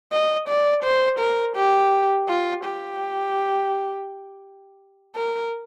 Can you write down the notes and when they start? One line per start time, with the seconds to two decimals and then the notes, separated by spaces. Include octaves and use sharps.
0.12 D#5
0.48 D5
0.83 C5
1.19 A#4
1.56 G4
2.28 F4
2.64 G4
5.15 A#4